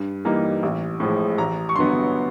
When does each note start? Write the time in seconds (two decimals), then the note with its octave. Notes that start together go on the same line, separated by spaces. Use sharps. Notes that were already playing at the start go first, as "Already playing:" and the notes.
Already playing: G2
0.25 E3 G3 A#3 D#4
0.63 A1
1.00 A2 F3 G#3
1.38 A1 A#5
1.69 C#6
1.76 G2 D3 F#3 B3 C6